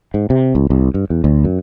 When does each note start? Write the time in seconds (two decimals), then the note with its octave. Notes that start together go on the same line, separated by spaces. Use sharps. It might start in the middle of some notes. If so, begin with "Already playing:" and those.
0.14 G#2
0.30 C3
0.55 C#2
0.70 C2
0.94 G2
1.10 E2
1.24 D2
1.44 F#2